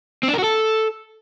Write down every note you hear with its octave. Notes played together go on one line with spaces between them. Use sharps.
C4
D4
A#4
F#4
A4